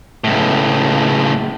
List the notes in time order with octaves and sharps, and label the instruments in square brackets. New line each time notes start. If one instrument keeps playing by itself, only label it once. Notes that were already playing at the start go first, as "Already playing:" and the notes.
[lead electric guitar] C#2 A2